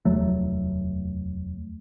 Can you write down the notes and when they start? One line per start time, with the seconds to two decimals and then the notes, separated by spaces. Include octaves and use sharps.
0.05 F1 D#2 F#3 A3